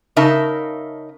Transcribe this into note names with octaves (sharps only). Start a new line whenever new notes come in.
C#3 D#4 A#4 E5 A5